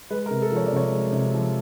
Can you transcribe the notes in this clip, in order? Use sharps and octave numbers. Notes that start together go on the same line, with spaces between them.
G#3 B4
A#4
C3
A4
F3 C#5
D5
C3 C#5
G#3
C3
F3